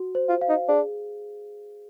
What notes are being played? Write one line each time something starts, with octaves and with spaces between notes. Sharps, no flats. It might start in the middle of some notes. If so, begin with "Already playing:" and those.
Already playing: F#4
C5
F4
F5
D#4
D4 G#4